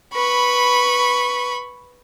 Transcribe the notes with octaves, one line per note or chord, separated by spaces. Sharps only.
B4 B5 C#6